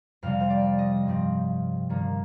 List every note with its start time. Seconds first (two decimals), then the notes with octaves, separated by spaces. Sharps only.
0.23 F2 C3 G3 F5
0.40 C5
0.50 D5
0.79 D#5
1.06 G2 F3 C4
1.89 G2 D#3 A#3